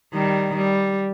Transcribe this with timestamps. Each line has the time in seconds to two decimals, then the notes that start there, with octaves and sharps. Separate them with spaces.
0.14 D#3 G3
0.56 G3